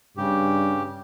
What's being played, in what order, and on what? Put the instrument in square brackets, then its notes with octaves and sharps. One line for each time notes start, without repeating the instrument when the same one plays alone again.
[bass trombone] G2 [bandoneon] C#3 G4